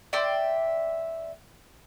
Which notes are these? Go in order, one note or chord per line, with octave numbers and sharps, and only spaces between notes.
D5 E5 G5 C6